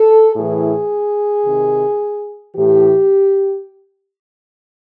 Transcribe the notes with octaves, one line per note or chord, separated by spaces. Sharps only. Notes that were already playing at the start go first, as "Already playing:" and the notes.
Already playing: A4
A2 E3 G#4
C3 D#3
A2 E3 G4